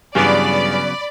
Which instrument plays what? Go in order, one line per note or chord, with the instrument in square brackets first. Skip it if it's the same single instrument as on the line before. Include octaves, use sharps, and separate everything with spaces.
[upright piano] G2 E3 G#4 [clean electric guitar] C#3 F#3 B3 [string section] D5 B5